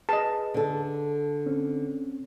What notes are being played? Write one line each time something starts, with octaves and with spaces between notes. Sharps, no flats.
G#4 B4 D#5 A5
D3 A4
C4 C#4